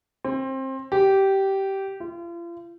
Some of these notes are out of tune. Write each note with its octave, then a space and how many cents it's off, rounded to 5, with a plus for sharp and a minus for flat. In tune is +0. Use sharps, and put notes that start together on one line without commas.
C4 +25
G4 -15
F4 -40